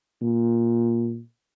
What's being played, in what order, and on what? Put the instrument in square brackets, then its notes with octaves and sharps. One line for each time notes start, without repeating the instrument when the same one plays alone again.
[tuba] A#2